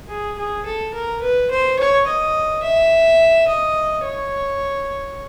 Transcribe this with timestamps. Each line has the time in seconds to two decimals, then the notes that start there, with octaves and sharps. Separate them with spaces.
0.09 G#4
0.38 G#4
0.65 A4
0.94 A#4
1.22 B4
1.51 C5
1.79 C#5
2.07 D#5
2.63 E5
3.48 D#5
4.05 C#5